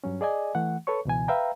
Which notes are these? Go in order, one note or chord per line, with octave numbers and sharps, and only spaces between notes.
G2 F#3 C#4
G#4 D5 D#5 G#5
E3 A3 F#5
A4 B4 C#5 C#6
C#2 B2 E3 G#5
B4 E5 F5 G5 A#5